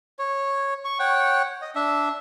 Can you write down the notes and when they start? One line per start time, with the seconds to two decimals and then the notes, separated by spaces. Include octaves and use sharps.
0.19 C#5
0.85 C#6
0.99 C#5 F#5 G5
1.62 D#5
1.75 D4 E5